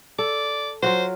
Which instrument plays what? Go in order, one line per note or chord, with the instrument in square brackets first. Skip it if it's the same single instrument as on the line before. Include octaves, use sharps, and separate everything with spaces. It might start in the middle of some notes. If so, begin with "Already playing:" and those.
[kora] A4 [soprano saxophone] D5
[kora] F#3 F4 F#4 [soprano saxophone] C5